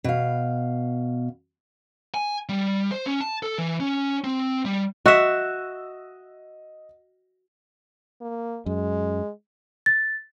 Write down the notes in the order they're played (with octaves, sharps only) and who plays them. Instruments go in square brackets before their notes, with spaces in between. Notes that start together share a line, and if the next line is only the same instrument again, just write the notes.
[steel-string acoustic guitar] B2 F5
[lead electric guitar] G#5
G3
C5
C#4
A5
A4
E3
C#4
C4
G3
[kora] F#4 E5 [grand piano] D#5 E6
[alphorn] A#3
[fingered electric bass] F#2 [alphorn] G#3
[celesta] A6